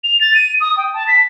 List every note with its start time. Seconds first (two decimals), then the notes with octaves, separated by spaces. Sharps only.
0.04 F7
0.21 A6
0.34 D#7
0.60 D#6
0.77 G5
0.93 A5
1.08 B6